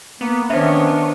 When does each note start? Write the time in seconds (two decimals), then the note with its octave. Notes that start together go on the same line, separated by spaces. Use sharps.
0.21 A#3 B3
0.50 D#3 B3 C#4 D4 C5 C#5 E5